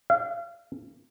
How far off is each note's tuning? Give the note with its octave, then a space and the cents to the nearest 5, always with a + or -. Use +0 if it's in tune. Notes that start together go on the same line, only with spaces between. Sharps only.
F5 -35